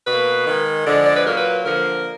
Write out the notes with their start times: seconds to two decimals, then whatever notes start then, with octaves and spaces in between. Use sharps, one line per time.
0.07 B2 A#3 B4
0.47 D#3 G#3
0.87 D3 F3 G#3 D5
1.07 D5
1.17 B4
1.26 A#2 F#3 A#3 A#4
1.38 B4
1.65 D3 F3 A#3 A#4